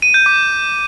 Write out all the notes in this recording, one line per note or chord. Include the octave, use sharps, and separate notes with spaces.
D#7
G6
D6